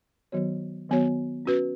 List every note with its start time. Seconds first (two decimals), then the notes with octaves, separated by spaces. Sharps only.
0.32 D#3 F#3 B3 F#4 C#5
0.89 D#3 F#3 B3 F#4 C#5
1.46 C#4 F#4 B4